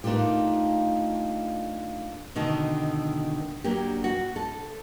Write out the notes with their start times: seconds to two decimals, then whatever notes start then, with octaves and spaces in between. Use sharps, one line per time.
0.04 A3 A#3 D4 D#4 F4 G4
2.36 B2 D3 D#3 A3
3.64 F#3 A#3 D4 G4
4.04 F#4
4.36 A4